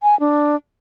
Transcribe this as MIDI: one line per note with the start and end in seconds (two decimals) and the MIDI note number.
0.03 0.18 80
0.20 0.56 62